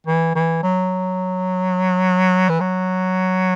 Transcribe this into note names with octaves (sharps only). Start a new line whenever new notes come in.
E3
E3
F#3
E3
F#3